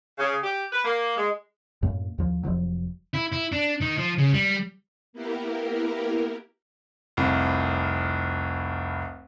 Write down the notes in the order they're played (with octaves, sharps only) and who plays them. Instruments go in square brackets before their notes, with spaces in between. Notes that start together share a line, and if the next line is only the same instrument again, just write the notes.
[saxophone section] C#3
G4
B4
A#3
G#3
[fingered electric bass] F#2 A2 A#3
D#2 F3
F1 D#2 F3 F#3
[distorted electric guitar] E4
E4
D4
D#3
F3
C#3
G3
[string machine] A#3 B3 E4 G4 A#4
[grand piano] F1 C2